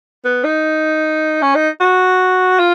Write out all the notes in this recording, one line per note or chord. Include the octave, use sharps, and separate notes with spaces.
B3
D#4
C#4
D#4
F#4
F4